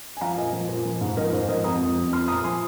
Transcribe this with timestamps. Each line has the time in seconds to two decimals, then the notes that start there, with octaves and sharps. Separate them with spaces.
0.17 G#5
0.21 F3 F5 A#5
0.37 A#2 D#5 G#5
0.53 F3
0.68 A#2
0.85 F3
1.01 G#2
1.17 F3 A#4 D#5
1.32 G#2 C5
1.48 F3 A#4 D#5
1.64 F2 A#5 D#6
1.81 F3
1.96 F2
2.12 F3 C6 F6
2.28 A#2 A#5 D#6
2.44 F3 G#5 C6